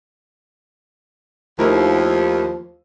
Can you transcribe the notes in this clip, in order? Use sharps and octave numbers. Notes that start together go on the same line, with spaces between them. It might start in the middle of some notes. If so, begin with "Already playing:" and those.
D#2 F3 A3 E4 A#4